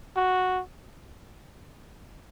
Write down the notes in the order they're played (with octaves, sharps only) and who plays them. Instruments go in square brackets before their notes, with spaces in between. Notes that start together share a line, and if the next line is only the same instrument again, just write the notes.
[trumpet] F#4